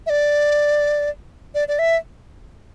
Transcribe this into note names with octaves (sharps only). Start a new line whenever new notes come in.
E5
D5
D5
D5
E5